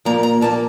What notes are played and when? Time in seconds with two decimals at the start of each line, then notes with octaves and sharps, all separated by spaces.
0.05 A#2 F3 A#3 A#5
0.23 A#5
0.41 A#2 F3 A#3 A5